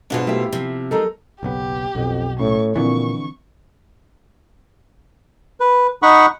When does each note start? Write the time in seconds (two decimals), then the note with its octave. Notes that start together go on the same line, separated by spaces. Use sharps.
0.10 G#2 B2 D4 F4 F#4 G#4
0.27 A3 E4 G4 E5
0.53 C3 F3
0.91 F3 G#3 D#4 A4 A#4 A#5
1.43 F#1 B1 B3 G4
1.95 B1 F2 B2
2.39 A2 C#4 C#6
2.76 A#2 D3 E3 F3 C4 E4 C#6
5.60 B4
6.02 D#4 F#5 B5 C#6